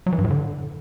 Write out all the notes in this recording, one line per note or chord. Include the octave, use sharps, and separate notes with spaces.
F#3
E3
G2
A2
D3